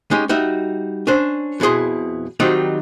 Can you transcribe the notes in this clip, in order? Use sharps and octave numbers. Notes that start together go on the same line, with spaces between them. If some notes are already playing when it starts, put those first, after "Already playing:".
G#3 C#4 D#4 G4
G3 D#4 F#4 E5
C#4 D4 C5
F2 B2 E4 G#4 C6
D#3 F#3 G3 C4 D#4 F4